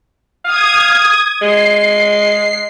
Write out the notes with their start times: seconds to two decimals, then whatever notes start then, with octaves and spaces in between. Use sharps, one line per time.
0.45 F5 D#6 G#6
1.42 G#3 C7